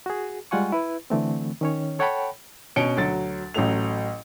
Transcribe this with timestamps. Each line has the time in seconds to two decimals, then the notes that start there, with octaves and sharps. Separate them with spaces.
0.06 F#4 G#4
0.51 G3 G#3 F4 F#5 G#5 C#6
0.72 E4 B4
1.10 D3 E3 A3 C4
1.61 D#3 C#4 C#5
1.99 A4 C#5 F#5 G5 A5 B5
2.76 B2 C#4 C#7 D7 G7
2.97 D2 F#3 A6
3.54 A1 F#3 A3 F7